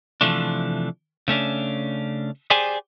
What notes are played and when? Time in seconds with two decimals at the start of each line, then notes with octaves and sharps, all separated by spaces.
0.21 C3 E3 F3 A3 D4
1.28 C#3 A3 C#4 D4
2.50 G4 G#4 C5 D5 G5 G#5